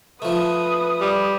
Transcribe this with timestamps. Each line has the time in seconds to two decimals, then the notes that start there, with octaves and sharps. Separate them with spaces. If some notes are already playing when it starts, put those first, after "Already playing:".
0.22 F3 A3 B4 D#6
1.01 G3